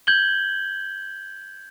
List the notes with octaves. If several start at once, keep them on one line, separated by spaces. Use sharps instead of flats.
G6 G#6 F#7 G7